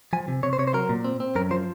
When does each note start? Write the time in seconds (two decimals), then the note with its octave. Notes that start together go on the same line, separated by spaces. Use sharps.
0.13 F3 G#5
0.28 C3
0.43 C3 C#5
0.53 C5
0.59 C3 C#5
0.67 C5
0.74 F#3 A#4
0.89 A#2
1.04 C4
1.20 C4
1.35 F#2 A#4
1.51 F3 C5